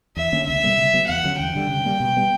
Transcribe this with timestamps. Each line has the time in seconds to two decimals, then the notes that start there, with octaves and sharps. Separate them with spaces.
0.17 E2 E5
0.32 D3 A#3 C#4
0.47 C#2 E5
0.63 B2 G3 A#3
0.78 C#3
0.94 F#3 B3
1.08 E2 F#5
1.24 D3 F#3 C#4
1.39 E2 G5
1.55 D3 G3
1.69 C#3
1.85 G3 A#3
2.00 B2
2.16 G3 B3